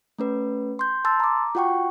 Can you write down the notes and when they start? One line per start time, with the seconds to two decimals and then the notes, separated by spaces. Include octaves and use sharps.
0.19 A3 C#4 B4
0.79 C6 G6
1.05 A5 C6 E6 A6
1.20 A#5 D6
1.55 F4 F#4 F#5 G5 C#6